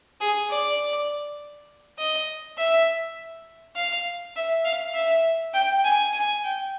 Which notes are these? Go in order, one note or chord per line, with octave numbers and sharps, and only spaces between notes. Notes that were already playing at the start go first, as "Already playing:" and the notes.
G#4
D5
D#5
E5
F5
E5
F5
E5
G5
G#5
G#5
G5